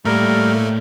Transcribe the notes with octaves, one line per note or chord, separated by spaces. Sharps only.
A2 G3 A3 A#3 A#4